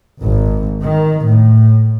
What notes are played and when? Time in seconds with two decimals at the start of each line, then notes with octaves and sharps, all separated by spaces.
0.22 G#1
0.84 D#3
1.28 A2